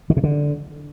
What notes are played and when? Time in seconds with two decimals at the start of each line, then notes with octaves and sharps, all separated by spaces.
0.10 D#3
0.17 C3
0.24 D3